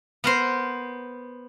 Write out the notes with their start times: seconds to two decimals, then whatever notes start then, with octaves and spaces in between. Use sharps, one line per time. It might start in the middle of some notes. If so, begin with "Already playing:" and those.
0.24 B3 A#4 C5